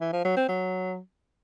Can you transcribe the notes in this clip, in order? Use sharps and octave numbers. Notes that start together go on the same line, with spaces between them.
E3
F3
F#3
C4
F#3